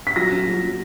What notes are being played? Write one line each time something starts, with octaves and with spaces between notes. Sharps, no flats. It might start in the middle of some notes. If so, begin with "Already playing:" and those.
B6
F#3 A#6
C#4
F#3
F#3